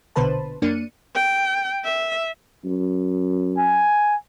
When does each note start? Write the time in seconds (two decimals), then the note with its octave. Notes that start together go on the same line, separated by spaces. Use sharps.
0.16 A#1 B2 D3 B4 C5 A5
0.62 F#2 A#3 D4 C#7 D#7
1.16 G5
1.84 E5
2.65 F#2
3.58 G#5